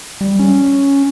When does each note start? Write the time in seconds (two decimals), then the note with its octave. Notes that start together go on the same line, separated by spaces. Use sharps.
0.21 G3
0.39 C#4